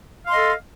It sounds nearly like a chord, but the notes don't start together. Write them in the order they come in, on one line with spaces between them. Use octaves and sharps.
F5 C6 D#5 A4